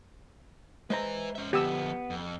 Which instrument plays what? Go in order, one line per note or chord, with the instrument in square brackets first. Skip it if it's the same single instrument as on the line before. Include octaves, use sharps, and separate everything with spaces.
[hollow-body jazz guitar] G#3 C5 A#5 [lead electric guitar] B4 E5
[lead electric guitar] C#4 E5
[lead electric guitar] D3 F3 [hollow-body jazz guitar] B3 [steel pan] G4 E6
[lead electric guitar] F2